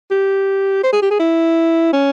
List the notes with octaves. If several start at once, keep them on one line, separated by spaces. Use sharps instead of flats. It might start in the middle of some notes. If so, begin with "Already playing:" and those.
G4
C5
G#4
G4
G#4
E4
C#4